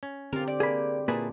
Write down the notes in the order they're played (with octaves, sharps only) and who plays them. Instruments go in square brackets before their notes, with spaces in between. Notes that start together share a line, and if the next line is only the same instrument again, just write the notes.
[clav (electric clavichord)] C#4
[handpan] D3 C4 G4 [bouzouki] F4 A#4
[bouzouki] D5
[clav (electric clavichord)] A#3 [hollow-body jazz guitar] G#4 B5
[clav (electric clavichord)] A#2 E4 G#4 [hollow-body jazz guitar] A#3 B4 [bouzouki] A5